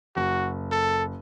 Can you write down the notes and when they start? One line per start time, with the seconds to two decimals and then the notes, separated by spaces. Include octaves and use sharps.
0.16 F#1 F#4
0.72 A4